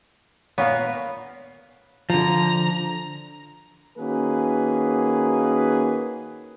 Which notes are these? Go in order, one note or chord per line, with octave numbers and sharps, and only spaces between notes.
A#2 B3 C#5 F5
D3 F3 A#5
D#3 A#3 C#4 F#4 G#4 B4